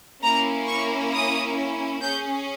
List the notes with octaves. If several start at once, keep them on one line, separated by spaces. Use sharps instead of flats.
A#3 C#4 E4 A#5
C#6
D#6
C#4 G#4 G6